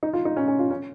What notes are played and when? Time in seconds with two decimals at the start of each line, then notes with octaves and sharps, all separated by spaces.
0.03 D#4
0.13 F4
0.25 D#4
0.37 C#4
0.48 C#4
0.59 F4
0.71 C#4